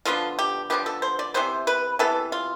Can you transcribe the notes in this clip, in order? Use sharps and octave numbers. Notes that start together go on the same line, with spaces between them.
D3 F3 B3 F4
G4
D3 F3 B3 G4
A4
C5
D5
C3 E3 B3 C5
B4
C3 E3 B3 A4
F4